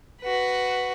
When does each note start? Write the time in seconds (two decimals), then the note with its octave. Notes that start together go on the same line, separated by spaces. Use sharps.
0.21 F#4 B4